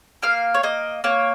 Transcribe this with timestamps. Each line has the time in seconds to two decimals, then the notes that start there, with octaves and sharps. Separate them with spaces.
0.23 A#3 F5
0.54 C#5
0.63 A#3 D#5
1.04 A#3 C#5